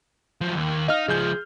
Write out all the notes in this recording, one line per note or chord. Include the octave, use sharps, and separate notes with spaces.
F3 F#3
D#2 A#3
D#4 D#5 F5 F6
C#2 F3 G#4 G6